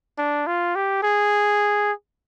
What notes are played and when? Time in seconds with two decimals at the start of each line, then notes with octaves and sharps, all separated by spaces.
0.18 D4
0.47 F4
0.76 G4
1.03 G#4